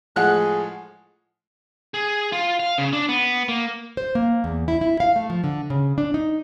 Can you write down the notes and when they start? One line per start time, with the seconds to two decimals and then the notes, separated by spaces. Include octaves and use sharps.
0.16 A2 F3 G#3 G#4 F#5 F#6
1.94 G#4
2.32 F4
2.60 F5
2.78 C#3
2.93 D4
3.09 B3
3.48 A#3
3.97 C5
4.15 A#3
4.44 E2
4.68 E4
4.81 E4
5.00 F5
5.16 A3
5.30 F3
5.44 D3
5.70 C#3
5.98 D4
6.14 D#4